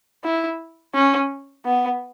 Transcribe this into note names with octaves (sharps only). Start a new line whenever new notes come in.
E4
C#4
B3